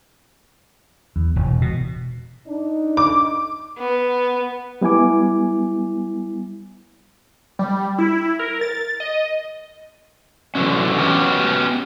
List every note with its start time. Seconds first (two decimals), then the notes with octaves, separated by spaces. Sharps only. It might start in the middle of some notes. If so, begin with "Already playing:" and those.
1.16 E2
1.36 E1
1.61 B2
2.47 D4 D#4
2.97 D6
3.79 B3
4.81 G3 B3 E4 G#5 D6
7.59 G3
7.99 E4
8.39 A#4
8.61 A6
9.00 D#5
10.55 D3 E3 F#3 C#4
10.98 B3 C#4 F#4 G4